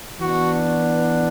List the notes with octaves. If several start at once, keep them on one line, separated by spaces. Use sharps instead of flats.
E3 B3 D4 F#4